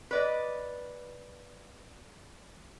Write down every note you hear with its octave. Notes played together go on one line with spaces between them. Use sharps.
B4 D5 D#5